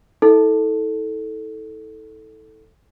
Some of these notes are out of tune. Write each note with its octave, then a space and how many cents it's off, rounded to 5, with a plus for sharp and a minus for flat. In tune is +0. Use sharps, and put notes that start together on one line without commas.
E4 -40 A4 +0